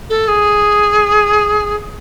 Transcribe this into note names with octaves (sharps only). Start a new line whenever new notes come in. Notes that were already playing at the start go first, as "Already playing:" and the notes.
A4
G#4